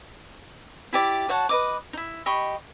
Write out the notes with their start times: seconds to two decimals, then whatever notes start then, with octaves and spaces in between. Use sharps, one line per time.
0.93 E4 G4 D5
1.29 F#4 C#5 F#5 A5
1.49 B4 D#5 D6
1.93 D#4 E4
2.26 G4 D#5 B5 C#6